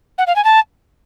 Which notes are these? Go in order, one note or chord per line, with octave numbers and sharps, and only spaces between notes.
F#5
F5
G#5
A5